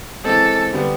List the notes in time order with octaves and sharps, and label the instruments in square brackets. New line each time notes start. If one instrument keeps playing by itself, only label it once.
[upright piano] E3 G#3 C4 [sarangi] A4
[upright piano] D3 G3 B3